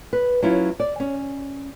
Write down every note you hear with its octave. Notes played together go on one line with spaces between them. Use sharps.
B4
F#3 C#4 E4 F4
D5
C#4